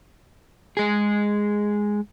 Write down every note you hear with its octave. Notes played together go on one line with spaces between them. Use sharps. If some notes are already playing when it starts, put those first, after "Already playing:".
G#3 G#4